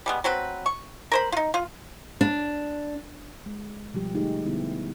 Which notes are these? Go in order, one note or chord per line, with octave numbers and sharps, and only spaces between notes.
G3 G#3 B3
F#3 C4 B4
C#6
A#4 C5 B5
D#4 F4
F4
D4
G#3
B2 F3 G3 G4
D3 G#3 A3 D#4 G4 G#4
D3 G3 B3 E4